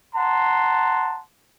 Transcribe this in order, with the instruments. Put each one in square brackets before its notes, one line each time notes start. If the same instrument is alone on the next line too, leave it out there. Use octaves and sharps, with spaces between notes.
[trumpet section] F#5 A#5 C6 [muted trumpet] A5